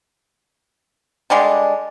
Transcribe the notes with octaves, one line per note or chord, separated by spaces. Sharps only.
D3 G3 G#3 D4